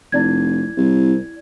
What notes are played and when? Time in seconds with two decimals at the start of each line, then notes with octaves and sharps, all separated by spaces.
0.12 F1 E4 D5 G#6
0.77 C2